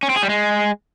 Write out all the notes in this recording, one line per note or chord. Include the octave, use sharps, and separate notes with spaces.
C#4
C4
G#4
G3
G#3